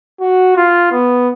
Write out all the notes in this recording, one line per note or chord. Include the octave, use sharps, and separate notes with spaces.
F#4
F4
B3